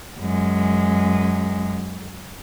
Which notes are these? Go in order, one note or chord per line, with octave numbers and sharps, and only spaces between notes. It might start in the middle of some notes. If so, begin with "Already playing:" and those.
F#2 G#3